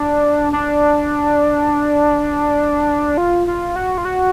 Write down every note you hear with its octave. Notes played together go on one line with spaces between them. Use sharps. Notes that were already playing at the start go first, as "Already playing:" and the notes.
Already playing: D4
D4
F4
F4
F#4
F4
F#4